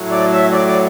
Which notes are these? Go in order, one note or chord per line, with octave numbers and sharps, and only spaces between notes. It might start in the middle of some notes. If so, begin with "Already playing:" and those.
Already playing: A2 F#3
D5
E5
D5
D5